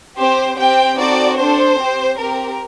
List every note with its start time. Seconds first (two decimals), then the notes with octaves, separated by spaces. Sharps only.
0.17 C4 G4 C5
0.57 C4 G4 G5
0.97 C4 D#4 F#4 A4 D5
1.38 D4 A4 C5
1.78 C4 G4
2.18 C4 G4 A#4